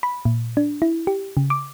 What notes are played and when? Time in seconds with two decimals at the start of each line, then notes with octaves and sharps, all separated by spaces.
0.03 B5
0.25 A#2
0.57 D4
0.82 E4
1.07 G4
1.37 C#3
1.50 D6